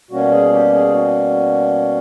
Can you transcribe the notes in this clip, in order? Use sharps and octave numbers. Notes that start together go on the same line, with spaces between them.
B2 G3 A#3 C#4 F#4
G#4
G4
G#4
F#4